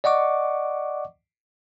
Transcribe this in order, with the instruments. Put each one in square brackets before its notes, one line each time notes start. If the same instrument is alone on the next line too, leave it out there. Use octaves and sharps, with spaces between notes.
[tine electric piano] D5 D#5 F#5 C#6 D6